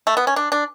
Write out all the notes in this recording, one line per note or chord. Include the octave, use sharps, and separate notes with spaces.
A3
B3
C#4
D4
D4